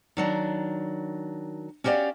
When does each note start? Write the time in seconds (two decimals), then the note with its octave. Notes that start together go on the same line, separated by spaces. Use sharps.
0.17 D#3 F#3 D4
1.84 C#4 F#4 G4 A#4 D5 F5